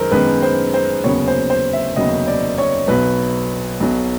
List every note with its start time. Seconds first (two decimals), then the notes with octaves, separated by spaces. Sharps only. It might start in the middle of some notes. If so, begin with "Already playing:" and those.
Already playing: F#2 D#3 G#3 A#4 C5
0.11 F#2 D#3 G#3 B3 B4
0.42 C5
0.74 C5
1.04 F1 D#2 C#3 F#3 B3 C#5
1.28 C5
1.50 C5
1.73 E5
1.96 F1 D#2 C#3 F#3 B3 D#5
2.27 D5
2.58 C#5
2.88 B1 B2 F#3 B4
3.80 B1 B2 F#3